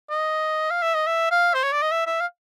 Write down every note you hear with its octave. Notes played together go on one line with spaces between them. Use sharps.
D#5
F5
E5
D#5
E5
F5
C5
C#5
D5
D#5
E5
E5
F5